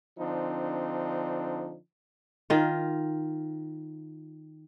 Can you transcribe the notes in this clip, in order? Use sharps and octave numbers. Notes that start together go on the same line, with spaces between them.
D3 F3 C4 D4 D#4
D#3 F4